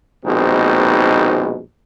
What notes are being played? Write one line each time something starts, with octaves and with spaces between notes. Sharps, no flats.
A#1 D#2 B2 G#3 C4 D#4